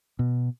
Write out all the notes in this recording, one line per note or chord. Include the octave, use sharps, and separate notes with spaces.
B2